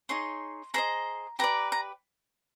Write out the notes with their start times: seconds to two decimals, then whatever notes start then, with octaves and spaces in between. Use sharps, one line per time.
0.09 D#4 G#4 C#5 C6
0.74 G#4 C5 D#5 A#5
1.39 G4 B4 D5 A#5
1.72 A#5